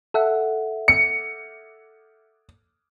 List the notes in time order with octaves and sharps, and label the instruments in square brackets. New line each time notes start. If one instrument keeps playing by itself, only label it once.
[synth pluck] A4 E5 F#5
[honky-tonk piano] C#7